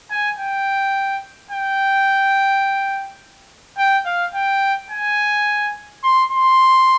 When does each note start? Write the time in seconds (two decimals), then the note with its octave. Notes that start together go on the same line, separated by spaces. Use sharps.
0.10 G#5
0.39 G5
1.51 G5
3.78 G5
4.06 F5
4.34 G5
4.91 G#5
6.04 C6
6.32 C6